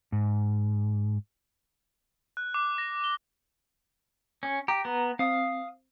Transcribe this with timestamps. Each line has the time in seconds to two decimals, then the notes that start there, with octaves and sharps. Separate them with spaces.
0.12 G#2
2.37 F#6
2.54 D6
2.78 A#6
3.04 G7
4.43 C#4
4.68 G4 A#5
4.85 B3
5.19 C4 F5 D#6